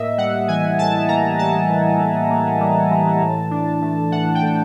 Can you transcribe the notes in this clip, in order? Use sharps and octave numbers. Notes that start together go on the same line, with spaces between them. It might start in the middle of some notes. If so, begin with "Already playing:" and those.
Already playing: A2 A#3 D#5 E5
G3 F#5
E3 G#5
A2 A5
A#3 A#5
G3 A5
E3
A2
A#3
G3
E3
A2
D4
A3
E3 F#5
G5
A2